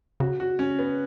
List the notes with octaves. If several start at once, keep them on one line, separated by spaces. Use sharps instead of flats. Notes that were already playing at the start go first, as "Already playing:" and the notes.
C#3 F#4
F#4
C#4
B3